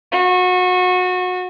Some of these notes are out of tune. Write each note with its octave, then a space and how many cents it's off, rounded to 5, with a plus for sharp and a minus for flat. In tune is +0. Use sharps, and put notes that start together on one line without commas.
F#4 -25